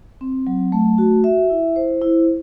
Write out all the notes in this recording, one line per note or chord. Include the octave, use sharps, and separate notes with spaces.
C4
F#3
A3
F#4
E5
E4
C5
E4